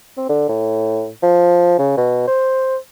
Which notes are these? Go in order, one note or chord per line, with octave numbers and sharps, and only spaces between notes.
C4
D3
A2
F3
C#3
B2
C5